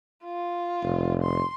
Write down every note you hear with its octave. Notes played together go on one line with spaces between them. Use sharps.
F4
F1
C6